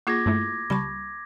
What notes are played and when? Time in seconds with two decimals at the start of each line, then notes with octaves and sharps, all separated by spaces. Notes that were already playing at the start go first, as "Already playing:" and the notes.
0.07 A#3 F4 G#4 D6 G#6 A#6
0.26 G2 A3 E4
0.70 C#2 G3 A5 B5 C#6